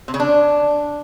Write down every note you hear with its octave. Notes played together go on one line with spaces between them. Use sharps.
C3
C#3
D4